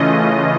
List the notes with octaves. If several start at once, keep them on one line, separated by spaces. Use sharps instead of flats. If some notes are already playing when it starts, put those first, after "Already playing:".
Already playing: C#3 E3 A3 C#4 F4 D#5